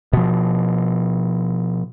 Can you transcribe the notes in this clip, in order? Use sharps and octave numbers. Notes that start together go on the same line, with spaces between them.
B2 F3